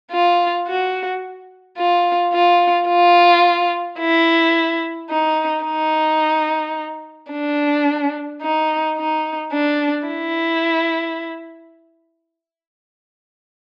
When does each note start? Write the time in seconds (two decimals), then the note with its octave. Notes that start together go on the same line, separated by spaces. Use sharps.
0.12 F4
0.68 F#4
1.78 F4
2.33 F4
2.88 F4
4.00 E4
5.10 D#4
5.65 D#4
7.32 D4
8.42 D#4
8.97 D#4
9.52 D4
10.08 E4